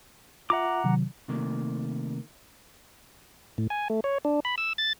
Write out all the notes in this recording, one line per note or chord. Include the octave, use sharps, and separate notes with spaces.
F4 E5 F#5 A#5 D6
C3 D#3 F#3
C3 D#3 A3 A#3
A2
G#5
A3
C#5
D4
B5
E6
A6